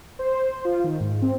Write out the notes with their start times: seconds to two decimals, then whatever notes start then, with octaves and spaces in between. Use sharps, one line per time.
0.19 C5
0.65 F4
0.84 D#3
1.00 G#2
1.22 C4